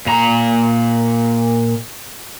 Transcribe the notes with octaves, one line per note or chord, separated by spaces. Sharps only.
A#2 A#5